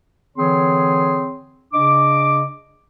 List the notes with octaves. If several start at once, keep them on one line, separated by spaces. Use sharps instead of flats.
D3 E3 C4 G#4 C#5 C6
C#3 D4 D#5 D6